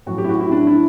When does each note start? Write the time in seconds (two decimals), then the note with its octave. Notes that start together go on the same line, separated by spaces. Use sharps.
0.06 A2 F#3 F#4
0.18 G4
0.24 E4
0.29 F#4
0.40 E4
0.52 D4
0.67 E4